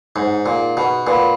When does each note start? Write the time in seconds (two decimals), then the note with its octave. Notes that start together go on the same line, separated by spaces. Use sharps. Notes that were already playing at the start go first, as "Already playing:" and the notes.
0.16 G#2 D#4 G#4 C#5 F#5
0.46 A#2
0.77 B2
1.07 A#2 B4 F#5 B5